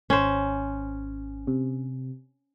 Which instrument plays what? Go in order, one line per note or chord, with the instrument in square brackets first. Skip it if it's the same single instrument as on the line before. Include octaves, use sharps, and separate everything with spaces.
[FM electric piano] G#1 [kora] C#4 C5
[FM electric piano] C3